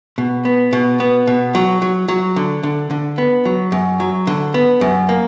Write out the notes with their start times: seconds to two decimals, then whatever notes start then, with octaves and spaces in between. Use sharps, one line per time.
0.18 B2
0.45 B3
0.73 B2
1.00 B3
1.27 B2
1.55 F#3
1.82 F#3
2.08 F#3
2.36 D3
2.63 D3
2.91 D3
3.18 B3
3.45 F#3
3.72 F#2
4.00 F#3
4.27 D3
4.54 B3
4.81 F#2
5.09 A#3